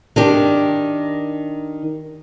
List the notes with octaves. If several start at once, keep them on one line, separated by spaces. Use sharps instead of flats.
D#3 D4 G4